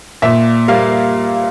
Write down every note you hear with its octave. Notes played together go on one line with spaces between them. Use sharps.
A#2 E5
G3 A#3 F5